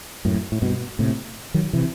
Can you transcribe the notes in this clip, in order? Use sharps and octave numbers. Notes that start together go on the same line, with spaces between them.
F#2 A2
A2
G2 B2
A2 C3
D#3 F#3
C3 E3